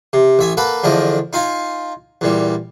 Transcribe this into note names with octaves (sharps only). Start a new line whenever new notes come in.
C3
A1 E5 G#5
A#3 A4 B4 F#5
E2 D3 F3 A3 D#5
D#4 F4 F5 G#5
E2 A#2 G3